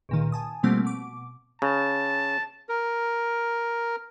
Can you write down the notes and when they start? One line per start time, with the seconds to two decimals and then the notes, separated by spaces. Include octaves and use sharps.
0.09 C#2 A#2 D#3
0.32 G#5 A5 D#6
0.63 B2 F3 G3 A3 A#3 C4
0.84 B2 D6
1.62 C#3 A5
2.69 A#4